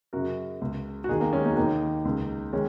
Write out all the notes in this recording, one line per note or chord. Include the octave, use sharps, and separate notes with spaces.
F#2 C#3 F#4 A#4
C#2 C#3
F#4
D#2 D#3 D#4 G#4
A#3 D#4
G#3 C#4
A#3 D#4
F#4
D#2 D#3 A#3 D#4
C#2 C#3
D#3 G#3 C#4